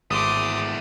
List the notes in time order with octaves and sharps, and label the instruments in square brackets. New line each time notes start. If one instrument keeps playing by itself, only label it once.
[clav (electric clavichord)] G#1 [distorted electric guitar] E2 A3 [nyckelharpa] C6 D6 [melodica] D#6